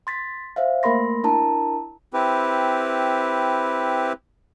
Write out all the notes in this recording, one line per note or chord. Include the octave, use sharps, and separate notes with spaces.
C6 A6 B6
C5 E5 F5
A3 A#3 A#4 B5 C6 A#6
D4 E4 A#4 A5 A#5
C4 E4 G4 B4